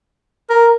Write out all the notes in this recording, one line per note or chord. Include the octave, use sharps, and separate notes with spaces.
A#4